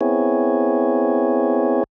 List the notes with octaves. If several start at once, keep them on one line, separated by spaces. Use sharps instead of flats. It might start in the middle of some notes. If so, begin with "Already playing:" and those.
B3 C4 E4 G#4 C#5